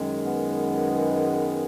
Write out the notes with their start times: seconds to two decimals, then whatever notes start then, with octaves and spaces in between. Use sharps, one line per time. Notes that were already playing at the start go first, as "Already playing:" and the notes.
Already playing: F#2 D#3 G#3
0.25 B3